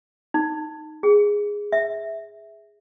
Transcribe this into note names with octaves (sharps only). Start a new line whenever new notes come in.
D#4
G#4
E5